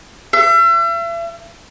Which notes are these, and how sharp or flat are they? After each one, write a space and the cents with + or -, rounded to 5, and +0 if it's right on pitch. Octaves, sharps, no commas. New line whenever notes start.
E5 +40